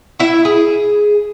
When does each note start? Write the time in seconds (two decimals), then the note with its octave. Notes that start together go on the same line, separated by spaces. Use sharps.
0.20 E4 E5
0.45 G#4